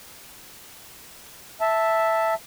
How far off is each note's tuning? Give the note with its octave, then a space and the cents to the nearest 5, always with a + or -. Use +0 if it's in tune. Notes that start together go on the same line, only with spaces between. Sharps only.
E5 +0 A5 +0